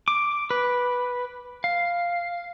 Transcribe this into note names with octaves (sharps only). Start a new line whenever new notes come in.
D6
B4
F5